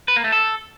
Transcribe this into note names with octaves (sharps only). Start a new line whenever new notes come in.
B4
A#3
A3
A4